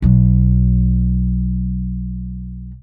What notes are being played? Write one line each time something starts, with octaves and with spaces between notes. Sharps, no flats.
B1 F#3